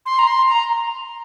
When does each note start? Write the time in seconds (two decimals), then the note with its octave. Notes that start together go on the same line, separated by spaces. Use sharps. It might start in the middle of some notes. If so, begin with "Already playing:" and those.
0.06 C6
0.19 A#5
0.27 C6
0.49 A#5